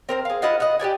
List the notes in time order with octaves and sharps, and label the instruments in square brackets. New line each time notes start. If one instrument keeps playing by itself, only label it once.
[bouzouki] C4 A#4 C5
G#4 F5
E4 F4 D#5 F#5
D#5 F#5
G4 G#4 D5 G#5